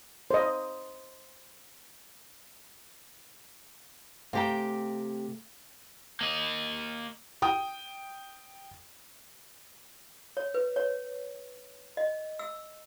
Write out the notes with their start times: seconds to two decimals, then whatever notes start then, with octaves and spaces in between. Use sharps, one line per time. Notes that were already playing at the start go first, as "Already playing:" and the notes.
0.31 C5 D#5
4.33 C3 A3 G4 F5 G5 G#5 A#5
6.21 A#3 D#5
7.42 G5 D#6
10.37 C#5
10.54 B4
10.76 C#5
11.97 D#5
12.39 E6